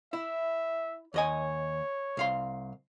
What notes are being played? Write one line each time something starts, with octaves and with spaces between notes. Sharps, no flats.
E4 E5
D#2 C#5 D#5 G#5
C2 F5 C6